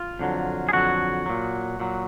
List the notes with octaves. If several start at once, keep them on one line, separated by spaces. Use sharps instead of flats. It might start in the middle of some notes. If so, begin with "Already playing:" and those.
Already playing: F4
F2 D3 F#3
G#4
F2 D3 F#3 F#4
A#2 F#3
A#2 F#3